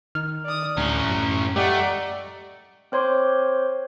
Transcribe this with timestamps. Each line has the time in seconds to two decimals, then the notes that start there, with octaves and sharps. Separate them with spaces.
0.15 D#3 F6
0.45 D5 D#6
0.77 D2 A2 C#4 A#5
1.08 F#2
1.56 A3 G4 D5 D#5 F#5 A#5
2.92 C4 C5 C#5 C6 D6